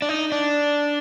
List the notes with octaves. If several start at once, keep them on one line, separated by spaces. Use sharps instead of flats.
D4
D#4
D4